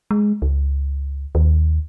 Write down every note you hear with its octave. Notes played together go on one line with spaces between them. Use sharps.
G#3
C#2
D#2